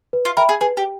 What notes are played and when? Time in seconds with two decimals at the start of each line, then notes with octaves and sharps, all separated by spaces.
0.13 B4
0.25 F4
0.37 A#4 E5 G5 B5
0.49 G#4
0.61 G#4 B4
0.77 G4